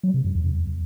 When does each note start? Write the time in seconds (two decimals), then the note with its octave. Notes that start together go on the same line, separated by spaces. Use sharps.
0.03 F#3
0.14 C3
0.25 F#2
0.35 E2